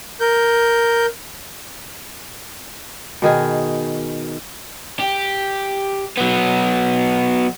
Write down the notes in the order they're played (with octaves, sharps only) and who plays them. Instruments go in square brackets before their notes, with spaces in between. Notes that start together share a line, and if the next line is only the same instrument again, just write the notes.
[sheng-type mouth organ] A#4 G6
[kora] B2 D#3 G#4
[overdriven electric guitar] G4
F#3 B3